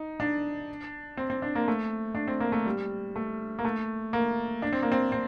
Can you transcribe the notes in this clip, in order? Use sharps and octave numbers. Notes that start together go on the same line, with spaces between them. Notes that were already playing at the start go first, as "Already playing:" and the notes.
Already playing: D#4
D4
C4
C4
D4
A#3
A3
D4
C4
A#3
A3
G3
A3
A#3
A3
A#3
D4
C4
A#3
C4
C4